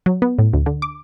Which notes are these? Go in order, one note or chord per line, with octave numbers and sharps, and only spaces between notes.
F#3
B3
A2
D2
D3
D6